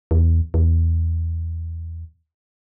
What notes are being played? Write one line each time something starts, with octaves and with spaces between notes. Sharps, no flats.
E2
E2